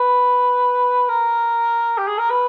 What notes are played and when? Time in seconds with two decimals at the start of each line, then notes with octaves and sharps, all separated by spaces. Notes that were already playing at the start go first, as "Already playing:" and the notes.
Already playing: B4
1.09 A#4
1.98 G4
2.07 G#4
2.18 A#4
2.30 B4